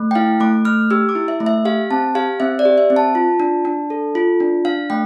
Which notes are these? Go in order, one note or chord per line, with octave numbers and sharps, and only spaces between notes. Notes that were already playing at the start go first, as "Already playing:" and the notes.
Already playing: A3
G5
E4 F5
A3 D6
A3 F6
G4 E6
D6
E4
E5
A3
E5
G4 F5
C4 A5
G4 F5
C4 E5
D5
G4
E5
C4
A5
F4
D4
D4
A4
F4
D4
D4 F5
A3 G5